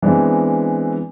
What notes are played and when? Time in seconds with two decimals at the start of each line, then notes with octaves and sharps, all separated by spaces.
0.02 E3 G#3 B3 C4 D4